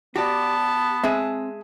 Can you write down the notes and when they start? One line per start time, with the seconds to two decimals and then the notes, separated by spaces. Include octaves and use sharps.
0.16 B3 F#4 G4 D5 A5
1.04 G#3 C4 G#4 E5